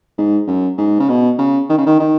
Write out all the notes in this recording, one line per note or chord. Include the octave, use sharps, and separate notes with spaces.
G#2
F#2
G#2
C#3
B2
C#3
D#3
C#3
D#3
D#3